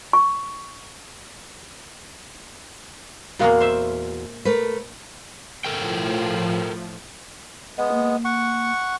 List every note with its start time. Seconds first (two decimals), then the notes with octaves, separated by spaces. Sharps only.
0.13 C#6
3.39 E2 A#2 G#3 A#3 F#4 F5
3.60 C5 E5
4.45 A3 A#4 B4
5.65 A2 F3 A4 A#4 G5
7.78 G#3 B3 B4
7.92 A#3
8.25 F#5 C#6